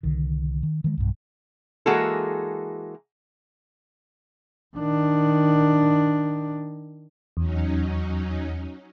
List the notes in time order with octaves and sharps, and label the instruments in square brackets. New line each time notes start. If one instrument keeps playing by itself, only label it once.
[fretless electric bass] C2 D3 D#3
D#3
D#3 E3 G#3
B1 G2
[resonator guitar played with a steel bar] E3 G#3 A#3 F#4 G#4 A4
[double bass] D#3 D4
[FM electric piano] E2 [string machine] F#3 C#4 D#4